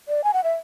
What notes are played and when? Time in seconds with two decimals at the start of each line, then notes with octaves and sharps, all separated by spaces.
0.08 D5
0.24 G#5
0.34 F#5
0.44 E5